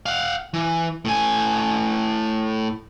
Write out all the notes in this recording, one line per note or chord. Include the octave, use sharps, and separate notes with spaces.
F5 F#5
E3
A2 G#5